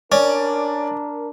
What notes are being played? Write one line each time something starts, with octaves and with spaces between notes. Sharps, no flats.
C#4 D4 A#4 D5